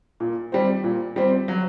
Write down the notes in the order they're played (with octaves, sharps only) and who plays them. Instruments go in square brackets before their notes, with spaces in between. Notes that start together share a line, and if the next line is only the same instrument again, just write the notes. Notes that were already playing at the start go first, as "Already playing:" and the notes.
[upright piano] A#2
G3 C4
A#2
G3 C4
F#3